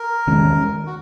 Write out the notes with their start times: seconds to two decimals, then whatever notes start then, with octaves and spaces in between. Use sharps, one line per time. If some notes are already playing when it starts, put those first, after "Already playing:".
Already playing: A#4
0.27 E2 D#3 G#3 C#4
0.86 F#4